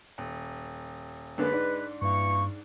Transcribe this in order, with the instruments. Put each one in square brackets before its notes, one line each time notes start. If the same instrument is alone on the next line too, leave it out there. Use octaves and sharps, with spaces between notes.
[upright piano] D#1
[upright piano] F#2 D3 A#3 [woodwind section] G#3 B4
[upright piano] G#2 D4
[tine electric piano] G2 [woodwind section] E3 A#3 C#6